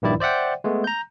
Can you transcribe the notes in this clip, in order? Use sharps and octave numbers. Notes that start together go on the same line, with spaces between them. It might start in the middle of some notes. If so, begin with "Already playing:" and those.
A#1 G2 D#3 E4 D5
C5 D5 E5 F#5 G5
G#3 A3 B3
A#5 G6